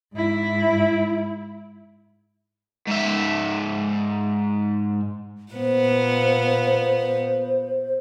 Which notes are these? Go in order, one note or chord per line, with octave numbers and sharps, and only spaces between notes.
G#2 E4
G#2 E5
A#2 B3 C5